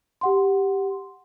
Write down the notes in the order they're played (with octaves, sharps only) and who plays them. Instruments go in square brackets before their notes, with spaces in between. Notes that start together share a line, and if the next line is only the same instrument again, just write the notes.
[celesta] G4 F#5 C6